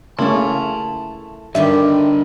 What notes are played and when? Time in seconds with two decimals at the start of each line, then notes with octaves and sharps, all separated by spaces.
0.19 C#3 A3 A#3 C#4 E4 A5 C6
1.55 G2 D3 D#3 G3 G4 E5